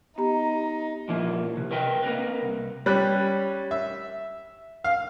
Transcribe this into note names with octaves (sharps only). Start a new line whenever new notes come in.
B3 D#4 G4 A#5
A#2 F3 A#3 E4
C3
A#4 B4 D#5 G5
A#3 C4 A#4 B4
C2
G3 C#4 B5 F#6
E5
F5